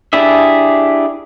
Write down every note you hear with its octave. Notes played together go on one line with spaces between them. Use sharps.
D4 E4 G4 G#4 E5